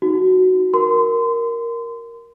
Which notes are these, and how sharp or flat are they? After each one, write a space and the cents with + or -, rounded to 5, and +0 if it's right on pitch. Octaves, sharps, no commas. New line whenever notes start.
D#4 +20 F#4 +0
A#4 +0 C6 -30